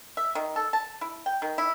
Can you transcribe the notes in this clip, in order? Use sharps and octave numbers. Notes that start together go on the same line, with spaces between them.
E5
D#3
A4
A5
E4
G5
D#3
E4